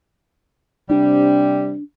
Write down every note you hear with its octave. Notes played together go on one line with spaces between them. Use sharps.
C3 G3 D4